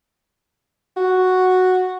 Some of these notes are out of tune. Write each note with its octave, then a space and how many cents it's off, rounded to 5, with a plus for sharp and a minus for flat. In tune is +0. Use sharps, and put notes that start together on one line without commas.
F#4 +0